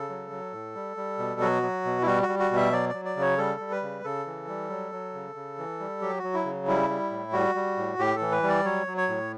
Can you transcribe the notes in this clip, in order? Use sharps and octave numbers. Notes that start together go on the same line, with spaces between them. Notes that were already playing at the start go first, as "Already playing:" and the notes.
Already playing: C#3 A4
F#3
F#3
A2
G3
G3
B2
F#3 F#4
F#3
B2
E4
G3 F#4
F#4
G3
F#4
B2
E5
F#3 D5
F#3 D5
D5
C#3
C#5
G3 A4
G3
B4
C#3
C#3 A4
E3
G3
F#3
F#3
C#3
C#3
E3
G3
F#3 G4
F#4
F#3
E4
C#3
G3 E4
G3
A2
G3 F#4
G3
A2
A2 G4
A4
E3
B4
G3
D5
F#3 C#5
F#3
C#5
A2